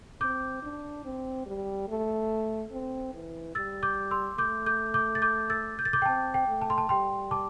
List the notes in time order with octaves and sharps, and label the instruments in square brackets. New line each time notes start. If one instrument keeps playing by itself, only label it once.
[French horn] C4 [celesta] D6 G6
[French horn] D4
C4
G3
A3
C4
E3
[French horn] G3 [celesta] E6 A6
[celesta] D6 G6
C6 E6
[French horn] A3 [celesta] D6 G6
[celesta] D6 G6
D6 G6
A6
D6 G6
E6 A6
G6
A6
D6 G6
G5
[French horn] C4 [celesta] A5
[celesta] G5
[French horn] A3
[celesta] A5
C6
A5
[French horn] G3 [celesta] G5 C6
[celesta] A5 D6